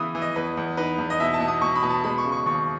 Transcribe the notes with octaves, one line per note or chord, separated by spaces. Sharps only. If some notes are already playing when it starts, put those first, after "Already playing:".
Already playing: C#3 E3 B3 B5 D#6
E3
D#5
E2 B4
E2
D#4 B4
E2
D#5
B2 E5
A5
B2
D#6
B2 C#6
B5
B2
A5
G#3 B5
C#6
C#3
C#6
D#2 C#6